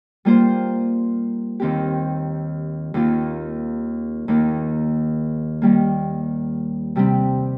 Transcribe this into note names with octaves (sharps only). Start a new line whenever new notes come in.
G3 A#3 F4 C5
D#2 D#3 C4 G4
D#2 D#3 A#3 F4
D#2 D#3 A#3
D#3 G3 A#3
C3 G3 C4